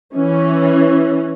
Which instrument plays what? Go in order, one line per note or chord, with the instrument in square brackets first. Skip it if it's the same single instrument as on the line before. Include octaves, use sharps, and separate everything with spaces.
[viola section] E3 C#4